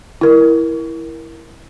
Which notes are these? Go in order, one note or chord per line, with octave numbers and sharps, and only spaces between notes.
E4 A#4